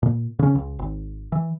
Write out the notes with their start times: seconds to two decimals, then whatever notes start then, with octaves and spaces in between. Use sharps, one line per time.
0.03 A#2
0.39 C#3 C#4
0.55 C#2
0.79 G#1
1.32 E3